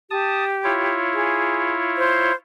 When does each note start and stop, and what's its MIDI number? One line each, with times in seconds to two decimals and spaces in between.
0.10 0.98 67
0.10 0.44 81
0.10 0.44 87
0.64 2.32 64
0.64 2.32 65
0.64 2.32 73
1.13 1.73 68
1.97 2.34 72